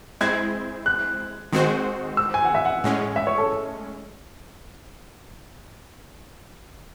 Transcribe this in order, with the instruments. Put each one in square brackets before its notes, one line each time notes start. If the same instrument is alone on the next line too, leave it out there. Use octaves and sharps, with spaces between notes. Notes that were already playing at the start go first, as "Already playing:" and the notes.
[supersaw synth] G#3 C4 E4 C5 [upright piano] G#6
[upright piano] F#6
[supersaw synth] D#3 G#3 C4 F#4 C5
[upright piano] E6
G#5
F#5
E5
F#5
[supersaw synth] A2 G#3 C#4
[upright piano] E5
C#5
A4